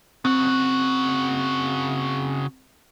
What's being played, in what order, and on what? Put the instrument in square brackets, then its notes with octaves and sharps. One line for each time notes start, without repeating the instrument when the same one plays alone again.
[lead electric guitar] C#3 F#4 [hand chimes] C4